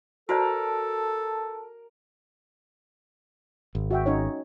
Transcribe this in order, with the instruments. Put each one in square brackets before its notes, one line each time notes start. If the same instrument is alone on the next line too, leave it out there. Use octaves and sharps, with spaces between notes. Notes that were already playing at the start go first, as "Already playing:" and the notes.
[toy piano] F#4 C5 D5 [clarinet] A4 [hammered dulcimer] A#4 [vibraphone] A5
[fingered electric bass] G#1
[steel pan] F#4 E5 G5
C#4 D#4 C#5